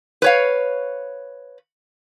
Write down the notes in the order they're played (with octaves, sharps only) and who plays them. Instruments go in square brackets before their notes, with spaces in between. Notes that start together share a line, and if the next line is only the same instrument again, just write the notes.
[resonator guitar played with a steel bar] B4 C#5 F5